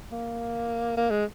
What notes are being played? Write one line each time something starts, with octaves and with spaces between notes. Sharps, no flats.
A#3
A#3
G#3